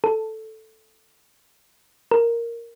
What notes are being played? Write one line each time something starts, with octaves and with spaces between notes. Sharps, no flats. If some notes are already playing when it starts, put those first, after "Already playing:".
A4
A#4